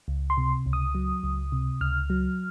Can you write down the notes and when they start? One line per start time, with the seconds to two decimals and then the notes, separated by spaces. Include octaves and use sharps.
0.08 C#2
0.30 C6
0.38 C3
0.66 C#2
0.73 D#6
0.95 F#3
1.23 C#2
1.52 C3
1.81 C#2 F6
2.10 F#3